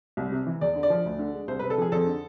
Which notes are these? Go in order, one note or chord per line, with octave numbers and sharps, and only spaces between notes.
C2
C3
E3
E2 D5
D3
D5
F3
D2
D3
G#3
C2 C5
C3 B4
A4
F3 G#4
F2 A4
D3